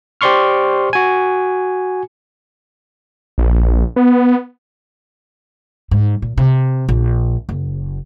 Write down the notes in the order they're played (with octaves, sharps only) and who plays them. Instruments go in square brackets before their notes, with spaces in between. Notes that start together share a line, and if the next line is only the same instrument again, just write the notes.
[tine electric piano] G4 C5 D5 C6 C#6 F6
F#4 G#5
[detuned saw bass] A#1
B3
[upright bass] G#2
A#2
C3
A#1
F#1